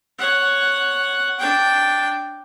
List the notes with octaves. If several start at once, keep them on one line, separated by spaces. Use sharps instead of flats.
C#5 F#5
D4 G5